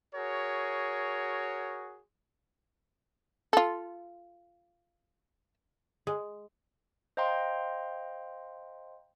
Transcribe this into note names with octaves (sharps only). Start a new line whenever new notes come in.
F#4 G#4 A#4 C#5
F4 A4
G#3
C5 D#5 F5 G5 A#5 C6